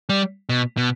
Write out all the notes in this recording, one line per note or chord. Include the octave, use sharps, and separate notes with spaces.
G3
B2
B2